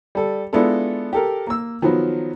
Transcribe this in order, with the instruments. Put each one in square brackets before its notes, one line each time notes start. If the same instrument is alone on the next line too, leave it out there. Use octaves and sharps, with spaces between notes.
[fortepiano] G3 A4
G#3 B3 D4 E4 F4 A4
G4 A4 A#4
A#3 E6
D#3 F3 F#3 B3